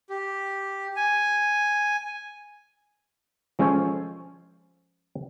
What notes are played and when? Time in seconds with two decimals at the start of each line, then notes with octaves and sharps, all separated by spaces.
0.10 G4
0.96 G#5
3.59 F3 G#3 C#4 A4 C5 C#5